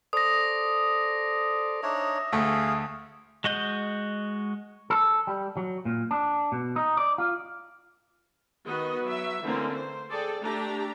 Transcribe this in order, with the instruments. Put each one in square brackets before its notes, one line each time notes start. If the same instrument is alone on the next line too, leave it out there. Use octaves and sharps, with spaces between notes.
[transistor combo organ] A4 C5 D5 [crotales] D#6 A#6
[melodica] D4 D#4 C#5 [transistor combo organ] E5
[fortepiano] D2 A3 [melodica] G#4 F5
[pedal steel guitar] G#3 F#4 D#5 G6
[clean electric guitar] A4
G3
F#3
A#2
D4
B2
D#4
D5
F4
[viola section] D#3 B3 F#4 D#5
F#3 E5
D3 E3 A3 A#3 C4 C#4
C5
G#4 A4 D5 G5
A3 D4 G4 A#5